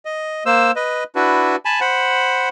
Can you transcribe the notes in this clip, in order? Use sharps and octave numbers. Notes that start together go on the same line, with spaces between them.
D#5
A#3 C5 E6
B4 D#5
D4 E4 F#4 B4
G#5 A5 B5
C5 F#5 B5